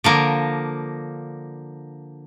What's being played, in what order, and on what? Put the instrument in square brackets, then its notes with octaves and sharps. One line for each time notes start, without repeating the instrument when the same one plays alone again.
[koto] D3 F3 A#3